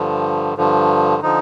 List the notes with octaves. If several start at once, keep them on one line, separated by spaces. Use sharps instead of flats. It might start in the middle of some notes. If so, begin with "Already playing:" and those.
Already playing: G2 D3 F3
G2 D3 F3
D3 F3 D#4